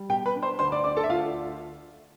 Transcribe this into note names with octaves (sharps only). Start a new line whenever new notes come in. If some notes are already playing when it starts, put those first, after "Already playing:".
Already playing: G3
B2 G4 G5
B4 B5
D4
C5 C6
D2 C5 C6
D5 D6
D3 D5 D6
A4 A5
E5
D2 F4 F5